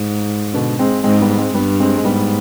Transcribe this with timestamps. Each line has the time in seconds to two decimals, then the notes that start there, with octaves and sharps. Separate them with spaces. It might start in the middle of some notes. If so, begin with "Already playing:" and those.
Already playing: G#2
0.54 B2 D3
0.79 G#3 C4
1.04 G#2 G#3 C4
1.21 G3 B3
1.38 G#3 C4
1.54 G2 G3 B3
1.80 G#3 C4
1.97 G#3
2.05 G#2 G3 B3